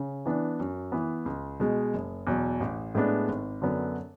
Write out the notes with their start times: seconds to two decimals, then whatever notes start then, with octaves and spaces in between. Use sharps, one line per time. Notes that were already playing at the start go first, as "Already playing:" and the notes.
Already playing: C#3
0.26 E3 B3 D4
0.60 F#2
0.92 E3 B3
1.26 C#2
1.60 B2 G#3
1.94 F#1
2.27 E2 B2 F#3
2.60 A1
2.95 A2 G#3 B3 D4
3.28 G#1
3.62 F#2 D3 F#3 B3